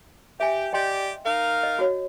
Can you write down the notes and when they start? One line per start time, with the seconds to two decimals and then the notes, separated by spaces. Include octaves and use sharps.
0.40 G4 E5 G#5
0.73 G4 D5 D#5 G5 C6
1.25 D#4 A#4 F5
1.63 D#5
1.79 F#4 C#5